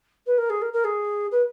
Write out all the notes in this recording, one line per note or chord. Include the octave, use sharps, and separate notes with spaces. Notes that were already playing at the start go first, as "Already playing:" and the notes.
B4
A#4
G#4
A#4
A#4
G#4
B4